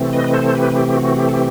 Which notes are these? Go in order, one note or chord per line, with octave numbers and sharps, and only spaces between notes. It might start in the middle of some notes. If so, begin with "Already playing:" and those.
Already playing: C3 E3 A3 C4
B4 D#5
B4
A4 C5
G4 B4
G4
F#4
G4
A4
G4